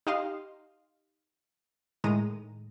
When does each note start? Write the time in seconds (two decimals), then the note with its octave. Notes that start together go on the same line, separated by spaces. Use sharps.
0.07 D#4 G4 D#5 F5 C6
2.04 A2 D#3 G#3 A#5 D#7